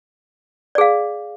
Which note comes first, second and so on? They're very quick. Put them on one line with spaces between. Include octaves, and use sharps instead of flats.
D5 G#4 F5